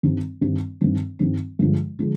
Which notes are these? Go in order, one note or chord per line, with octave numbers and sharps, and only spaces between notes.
G2 D#3 G3 C4
G2 D#3 G3 C4
G2 D#3 G3 C4
G2 D#3 G3 C4
G2 D3 F3 G#3
D3 F3 G#3